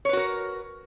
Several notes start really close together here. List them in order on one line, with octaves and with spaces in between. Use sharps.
C#5 B4 F#4 A#4